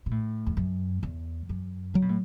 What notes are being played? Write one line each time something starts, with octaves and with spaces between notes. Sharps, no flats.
B2
A2
E2
F#2
E2
F#2
D3 F#3
B2
A2